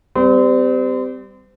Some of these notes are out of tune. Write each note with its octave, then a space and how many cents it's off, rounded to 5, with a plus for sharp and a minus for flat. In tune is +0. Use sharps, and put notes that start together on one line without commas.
G3 +0 C4 -35